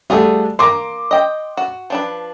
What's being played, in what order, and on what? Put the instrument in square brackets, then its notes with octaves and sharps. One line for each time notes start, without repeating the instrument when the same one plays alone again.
[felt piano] G3 A3 [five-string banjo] F4 F#4 G#4
[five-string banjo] A#3 A#5 [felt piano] C6 D6
[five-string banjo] D#5 G5
F#4
F3 D4 B4